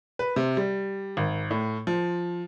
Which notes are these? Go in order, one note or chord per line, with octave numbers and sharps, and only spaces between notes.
B4
C3
G3
G#1
A2
F3